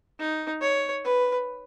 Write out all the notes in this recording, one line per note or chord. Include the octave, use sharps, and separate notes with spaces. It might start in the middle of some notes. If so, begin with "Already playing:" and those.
D#4
C#5
B4